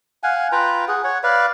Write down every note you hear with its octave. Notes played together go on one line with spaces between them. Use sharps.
F5 F#5 G#5
F4 B4 G5 A#5
G#4 F#5
C#5 F#5
B4 D5 F5